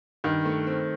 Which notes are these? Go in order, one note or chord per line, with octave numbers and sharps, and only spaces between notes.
G2 D#3
A3
C4